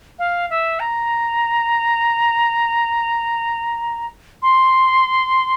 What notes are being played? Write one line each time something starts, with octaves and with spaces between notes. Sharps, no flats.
F5
E5
A#5
C6